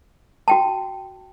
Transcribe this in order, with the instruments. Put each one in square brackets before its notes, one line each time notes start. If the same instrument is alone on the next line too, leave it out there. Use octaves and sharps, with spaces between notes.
[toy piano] F#4 G5 A5